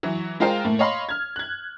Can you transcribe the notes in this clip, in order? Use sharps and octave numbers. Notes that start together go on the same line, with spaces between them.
E3 F#3
G#3 F4 A#4 C5 F5 G5
A2 A3 A#3
C#5 D#5 F5 B5 C6
F6 G#6
F#6 G#6